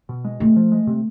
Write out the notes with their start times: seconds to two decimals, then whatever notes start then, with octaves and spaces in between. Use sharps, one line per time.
0.09 B2
0.25 G#3
0.40 C3 A3
0.56 F3
0.72 G#3
0.87 C3